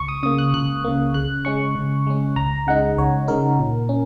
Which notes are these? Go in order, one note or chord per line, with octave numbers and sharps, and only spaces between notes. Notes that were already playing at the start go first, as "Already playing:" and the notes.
Already playing: C#2 C#6
D#6
C#3 A#3 D#6
F#6
C#2 F#6
C#3 A#3
C#3 F#6
G#3 C#4 C#6
C#3
G#3 C#4
C#2 A#5
C#3 G#3 D#4 F#5
C#2 C#5
C#3 G#3 D#4 A#4
A#2
C#4